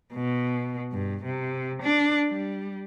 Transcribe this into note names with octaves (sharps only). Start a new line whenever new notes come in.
B2
G2
C3
D4
G3